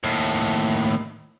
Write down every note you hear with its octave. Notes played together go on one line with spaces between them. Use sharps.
D#2 A2